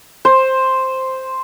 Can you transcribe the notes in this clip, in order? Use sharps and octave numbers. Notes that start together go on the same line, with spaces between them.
C5